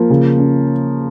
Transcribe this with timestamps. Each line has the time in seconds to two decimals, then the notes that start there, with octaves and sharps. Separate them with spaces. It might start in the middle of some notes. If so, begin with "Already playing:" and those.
Already playing: F3 A#3
0.10 C#3
0.38 C#4